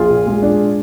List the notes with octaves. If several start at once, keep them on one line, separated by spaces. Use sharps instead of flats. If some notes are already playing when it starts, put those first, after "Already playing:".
Already playing: A#1 F4 G#4
A#2
G#3
D4